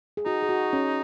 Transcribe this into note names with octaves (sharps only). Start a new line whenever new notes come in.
G#4
D#4 F#4
G#4
F#4
C#4